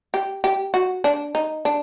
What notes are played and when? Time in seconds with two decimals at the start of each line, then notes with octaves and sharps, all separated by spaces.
0.14 G4
0.44 G4
0.74 F#4
1.04 D4
1.35 D#4
1.65 D4